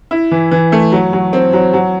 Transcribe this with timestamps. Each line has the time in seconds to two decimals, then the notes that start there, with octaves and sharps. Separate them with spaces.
0.11 E4
0.31 E3
0.51 E3
0.72 A3
0.92 F#3
1.13 F#3
1.33 C4
1.53 F#3
1.73 F#3